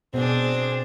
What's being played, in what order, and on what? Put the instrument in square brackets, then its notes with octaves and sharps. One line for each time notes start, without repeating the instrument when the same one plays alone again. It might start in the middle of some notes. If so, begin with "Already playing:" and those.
[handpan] B2 B3 [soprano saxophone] C4 [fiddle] D4 G#4